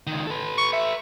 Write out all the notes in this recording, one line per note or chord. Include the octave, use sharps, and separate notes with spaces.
C#2 D#3
A4 B4
C#6
E5